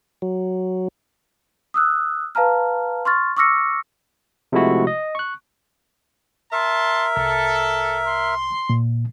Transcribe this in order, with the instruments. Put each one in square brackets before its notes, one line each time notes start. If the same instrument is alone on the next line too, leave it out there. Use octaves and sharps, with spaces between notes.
[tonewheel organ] F#3
[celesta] D#6 E6 F#6
B4 F5 A5 A#5 F6
C6 C#6 F6 A6
C#6 D6 E6 F6 A#6 C#7
[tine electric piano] C3 F3 G#3 A3 E4 F#4
D#5
C#6 F#6
[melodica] A#4 E5 [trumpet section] A5 C6
[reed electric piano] C2 [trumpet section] A4
[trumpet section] C6
[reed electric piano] A#2